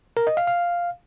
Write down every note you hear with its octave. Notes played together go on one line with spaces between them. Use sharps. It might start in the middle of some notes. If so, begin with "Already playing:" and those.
A#4
D#5
F5
F5